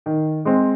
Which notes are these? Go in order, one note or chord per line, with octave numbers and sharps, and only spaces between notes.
D#3
G#3 C4